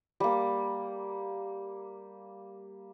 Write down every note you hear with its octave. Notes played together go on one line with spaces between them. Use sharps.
G3 A#3